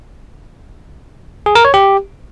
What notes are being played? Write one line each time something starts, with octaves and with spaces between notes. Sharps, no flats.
G#4
A#4
C#5
G4